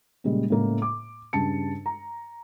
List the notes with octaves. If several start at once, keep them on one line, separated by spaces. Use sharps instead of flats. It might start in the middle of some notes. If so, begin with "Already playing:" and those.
A#2 C#3 G3 G#3
A2 C#3 G#3 A#3
D6
G2 C#3 A5 C#7
A#5